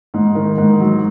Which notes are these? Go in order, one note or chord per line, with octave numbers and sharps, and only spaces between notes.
G#2
D#3
G#2
F#3